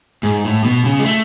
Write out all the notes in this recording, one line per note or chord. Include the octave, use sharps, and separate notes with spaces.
G#2
A2
B2
C#3
G#3
A3